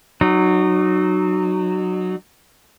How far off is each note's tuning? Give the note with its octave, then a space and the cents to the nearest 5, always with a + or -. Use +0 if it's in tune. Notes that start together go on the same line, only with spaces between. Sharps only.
F#3 +0 D#4 -30